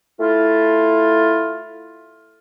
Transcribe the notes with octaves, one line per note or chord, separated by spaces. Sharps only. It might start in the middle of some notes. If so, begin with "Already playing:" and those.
A3 E4 F4